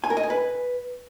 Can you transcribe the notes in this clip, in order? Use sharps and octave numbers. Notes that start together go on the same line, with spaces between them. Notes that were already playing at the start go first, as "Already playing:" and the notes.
G#5
A#4
D#5
G#5
B4